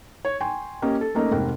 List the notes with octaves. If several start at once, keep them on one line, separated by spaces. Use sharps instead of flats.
C#5
G5 G#5 C6 C#6
A#3 C#4 G4 D#5
A4
A3 A#3 C#4 D#4
F1 G#2 A#4 G5